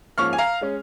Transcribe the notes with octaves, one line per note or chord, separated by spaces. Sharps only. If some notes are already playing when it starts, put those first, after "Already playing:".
G#2 F3 A#3 C#4 C#6 F6
G#5
F5 A#5
G#3 C#4